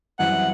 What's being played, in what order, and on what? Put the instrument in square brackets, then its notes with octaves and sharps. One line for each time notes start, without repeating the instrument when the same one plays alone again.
[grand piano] F#2 E3 G3 C4 E4 [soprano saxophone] F#5